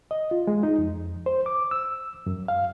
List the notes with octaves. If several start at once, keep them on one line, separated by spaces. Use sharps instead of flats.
D#5
F4
G#3
D#4
F2
C5
D6
E6
F#2
F5